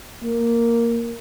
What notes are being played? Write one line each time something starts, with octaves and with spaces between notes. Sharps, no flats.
A#3